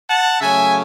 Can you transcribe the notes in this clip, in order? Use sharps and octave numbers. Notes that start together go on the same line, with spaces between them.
F#5 A5
C#3 F#3 A3 C#4 E5 G#5